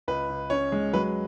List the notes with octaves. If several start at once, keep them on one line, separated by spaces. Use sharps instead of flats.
C#2 B4
C#2
C#4 C#5
G#3
F#3 B4